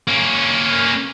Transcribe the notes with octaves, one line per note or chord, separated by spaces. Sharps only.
A#3 C#4